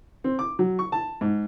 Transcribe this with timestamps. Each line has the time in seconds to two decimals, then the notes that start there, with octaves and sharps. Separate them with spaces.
0.24 C4
0.39 D6
0.59 F#3
0.79 C#6
0.92 A5
1.21 G#2